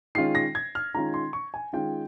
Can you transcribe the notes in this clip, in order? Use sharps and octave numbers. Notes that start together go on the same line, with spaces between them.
D#3 G#3 C#4 F4 C7
A#6
G#6
F6
D#3 G#3 C#4 F4 A#5
C6
C#6
G#5
D#3 G#3 C#4 F4 G5